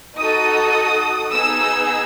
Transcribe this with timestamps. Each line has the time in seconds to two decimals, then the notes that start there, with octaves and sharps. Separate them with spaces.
0.19 D#4 F#4 A4 D#6
1.32 B3 D#4 G#4 E6
1.61 E6